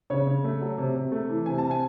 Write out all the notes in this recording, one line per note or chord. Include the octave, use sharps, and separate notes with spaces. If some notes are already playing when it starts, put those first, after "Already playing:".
C#3 C#5
C#3
A3
F#3
C3
C3
A3
E3
C3 G#5
C3 A5
G#5